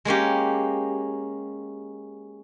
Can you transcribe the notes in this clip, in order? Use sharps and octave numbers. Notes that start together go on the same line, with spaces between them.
G#3 A#3 C#4 G4